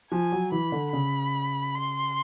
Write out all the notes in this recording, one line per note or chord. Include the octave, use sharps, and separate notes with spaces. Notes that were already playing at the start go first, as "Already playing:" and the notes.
F3 G#5
F#3
E3 B5
D3
C#3 B5
C6